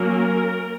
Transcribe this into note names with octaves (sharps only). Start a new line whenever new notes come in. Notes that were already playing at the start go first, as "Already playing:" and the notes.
Already playing: F#3 A#3 C#4 A#4